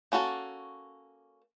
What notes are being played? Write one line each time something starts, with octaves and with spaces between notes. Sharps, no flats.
A#3 C#4 F#4 A4